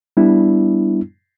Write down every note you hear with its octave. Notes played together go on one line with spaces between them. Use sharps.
G3 B3 D4 E4